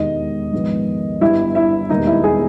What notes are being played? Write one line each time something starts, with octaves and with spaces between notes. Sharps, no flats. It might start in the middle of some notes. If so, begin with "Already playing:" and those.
Already playing: E1 D#2 D#3 G#3 D#4 D#5
A#1 G#2 D#3 G#3 B3
G1 G2 G3 E4 E5
E4 E5
E1 D#2 D#3 G3 A#3 D#4 D#5
E4 E5
G#4 G#5